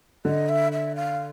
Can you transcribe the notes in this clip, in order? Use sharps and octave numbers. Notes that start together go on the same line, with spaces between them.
D3 D#5
E5
E5
F5